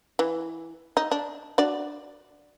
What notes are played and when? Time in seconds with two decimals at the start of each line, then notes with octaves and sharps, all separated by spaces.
0.19 E3
0.97 D#4
1.12 D4
1.58 D4 F#4 D5